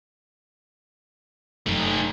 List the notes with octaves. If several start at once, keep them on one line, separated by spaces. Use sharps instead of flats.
F#1 F#2 F#3 A3 D#4